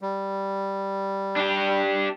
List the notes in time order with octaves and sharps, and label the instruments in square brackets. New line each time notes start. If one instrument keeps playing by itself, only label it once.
[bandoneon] G3
[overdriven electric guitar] D4 G4